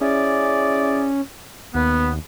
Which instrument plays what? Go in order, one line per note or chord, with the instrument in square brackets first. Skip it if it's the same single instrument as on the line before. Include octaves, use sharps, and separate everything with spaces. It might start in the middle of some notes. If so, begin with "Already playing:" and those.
[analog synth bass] C#4 [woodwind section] E4 G#4 D5
[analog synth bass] D#2 [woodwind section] B3